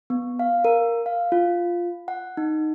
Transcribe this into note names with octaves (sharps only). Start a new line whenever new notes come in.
B3
F5
A#4
F5
F4
F#5
D#4